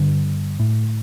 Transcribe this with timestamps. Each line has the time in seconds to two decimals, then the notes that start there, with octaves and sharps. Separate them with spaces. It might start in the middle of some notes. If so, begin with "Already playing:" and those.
Already playing: G2 D3
0.60 A2